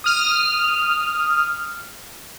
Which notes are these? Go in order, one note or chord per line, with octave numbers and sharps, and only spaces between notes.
D#6 F6